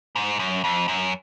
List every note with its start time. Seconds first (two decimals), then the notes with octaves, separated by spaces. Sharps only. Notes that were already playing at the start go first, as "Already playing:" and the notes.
0.16 G#2
0.39 F#2
0.64 F2
0.88 F#2